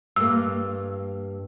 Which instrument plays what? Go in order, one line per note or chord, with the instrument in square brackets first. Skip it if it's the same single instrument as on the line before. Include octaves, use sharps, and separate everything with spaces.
[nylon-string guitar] G2 A#3 [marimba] E6